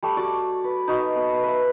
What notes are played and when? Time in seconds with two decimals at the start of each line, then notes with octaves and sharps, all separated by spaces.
0.03 G3 A3
0.17 F#4 D5 A5
0.64 B4
0.88 D#4 F#4
1.16 B3
1.44 B4 E5